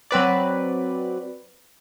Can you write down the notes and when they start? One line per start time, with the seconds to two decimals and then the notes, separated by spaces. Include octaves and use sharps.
0.11 F#3 C4 B4 D5